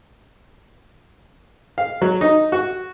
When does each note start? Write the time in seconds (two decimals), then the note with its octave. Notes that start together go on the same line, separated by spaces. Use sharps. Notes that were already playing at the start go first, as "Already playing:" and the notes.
1.78 F5
2.02 F#3
2.21 D#4
2.52 F#4